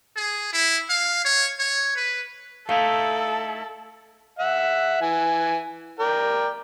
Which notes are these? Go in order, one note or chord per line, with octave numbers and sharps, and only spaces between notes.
G#4
E4
F5
C#5
C#5
B4
A3 D#4 E4 A4 F5
E5 F#5
E3 G#5
A#4 D5 G5